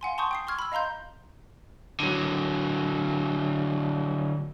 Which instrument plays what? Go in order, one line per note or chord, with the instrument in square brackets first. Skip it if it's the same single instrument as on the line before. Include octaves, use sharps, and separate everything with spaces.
[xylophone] F5 F#5 G#5 C6
A5 C6 C#6 D#6 G6
G5 D#6 C7
C6 C#6 F6 G#6
B5 E6
D#5 F5 A#5 C6 G6
[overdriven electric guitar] D3 F#3